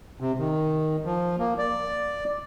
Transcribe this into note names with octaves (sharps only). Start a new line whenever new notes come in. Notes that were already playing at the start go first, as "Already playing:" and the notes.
C3
D#3
F3
A#3
D5